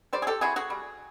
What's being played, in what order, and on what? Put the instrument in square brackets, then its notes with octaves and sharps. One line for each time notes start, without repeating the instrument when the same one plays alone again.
[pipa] G3 C5 D5
G#4
G4 A4
C4 E4 F#4 G#4
F#4 G#4
G3